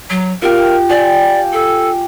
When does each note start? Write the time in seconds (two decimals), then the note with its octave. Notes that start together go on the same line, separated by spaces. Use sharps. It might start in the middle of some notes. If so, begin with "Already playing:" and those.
0.10 F#3
0.42 F4 G4 A#4
0.90 G4 D5 G5 G#5
1.53 A4